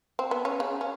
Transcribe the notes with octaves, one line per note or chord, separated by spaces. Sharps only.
C4
B3
C#4
C#3
C#4